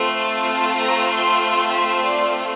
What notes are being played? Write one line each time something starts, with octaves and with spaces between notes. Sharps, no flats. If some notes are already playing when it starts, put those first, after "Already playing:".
Already playing: A3 C4 F4
A5
A5
A#5
C6
C6
E5
D5